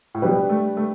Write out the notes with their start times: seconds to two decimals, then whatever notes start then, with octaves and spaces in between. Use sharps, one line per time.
0.15 A2
0.22 B2 G3 D4 G4 B4
0.49 A3
0.77 A3